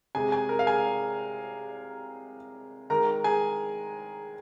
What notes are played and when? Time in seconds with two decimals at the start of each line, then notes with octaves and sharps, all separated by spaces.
0.15 C3 G#3 G#4 G#5
0.32 G#4 G#5
0.49 A#4 A#5
0.59 F5
0.67 G#4 G#5
2.90 D#3 G#3 A#4 A#5
3.24 G#4 G#5